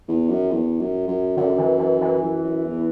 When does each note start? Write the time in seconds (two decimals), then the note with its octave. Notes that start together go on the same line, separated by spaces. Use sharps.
0.08 E2
0.30 F#2
0.51 E2
0.80 F#2
1.08 F#2
1.37 F#2 D3
1.58 E3
1.79 E3
2.01 E3
2.22 F#2
2.44 F#2
2.65 E2